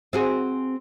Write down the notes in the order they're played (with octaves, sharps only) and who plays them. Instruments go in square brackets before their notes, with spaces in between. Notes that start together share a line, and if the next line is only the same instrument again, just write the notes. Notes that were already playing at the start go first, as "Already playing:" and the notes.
[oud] C4 F#4 G#4